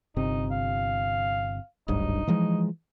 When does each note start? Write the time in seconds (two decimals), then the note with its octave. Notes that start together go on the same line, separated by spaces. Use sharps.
0.16 G1 C3 C4 D#4
0.51 F5
1.88 D1 G#1 G2 D#4
2.27 E3 F3 G#3